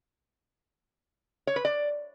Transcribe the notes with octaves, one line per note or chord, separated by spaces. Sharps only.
C#5
B4
D5